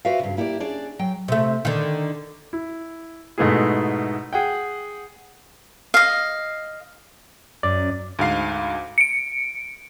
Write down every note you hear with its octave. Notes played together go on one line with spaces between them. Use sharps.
F#4 B4 C5 D5 E5 F5
G2 C#3
A#3 E4 G4 A4 D5
C#4 D4 G#4 D5
F#3 G5
C3 A3
D3 D#3
E4
G#2 B2 A3 B3 E4 G#4
G#4 F#5 G5
D#5 F5
F#2 D5
D2 G#2 F5 C7
C#7 D7